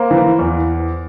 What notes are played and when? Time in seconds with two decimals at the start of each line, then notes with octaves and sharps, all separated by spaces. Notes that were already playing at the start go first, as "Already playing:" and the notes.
Already playing: A#3 C5
0.11 E3
0.39 E2